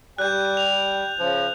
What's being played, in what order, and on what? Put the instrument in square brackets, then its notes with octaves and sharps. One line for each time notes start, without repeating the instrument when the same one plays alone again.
[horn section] G3 G5 [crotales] F#6 G6
[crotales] F7
[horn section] C#3 F3